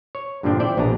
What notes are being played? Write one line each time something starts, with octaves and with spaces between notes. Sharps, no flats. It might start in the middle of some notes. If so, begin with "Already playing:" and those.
C#5
G2 A#2 D3 F3 C4 D4
E4 C5 D5 E5 G5
A#1 B2 D4 A#5